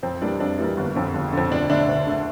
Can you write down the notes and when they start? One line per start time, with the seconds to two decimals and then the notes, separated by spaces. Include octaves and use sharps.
0.03 F2 C4
0.21 E3 G3 A#3 D4
0.40 F2 D4
0.58 E3 G3 A#3
0.77 G1
0.96 F2 D3
1.14 G1
1.33 F2 D3
1.51 D2 D4
1.70 D3 A3 D4
1.88 D2
2.07 D3 A3